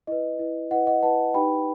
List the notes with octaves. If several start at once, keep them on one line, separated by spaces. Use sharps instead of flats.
E4 B4 D#5
E4 B4
E4 B4 D#5 F#5
D#5 F#5
E4 B4 F#5 A5
D#4 G4 B4 G5 B5